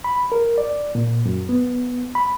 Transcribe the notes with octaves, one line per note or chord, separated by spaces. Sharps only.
B5
A#4
D5
A#2
F#2
B3
B5